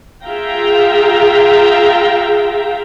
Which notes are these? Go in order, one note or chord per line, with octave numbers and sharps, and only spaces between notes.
F4 G#4 E5 F5 G5 A#5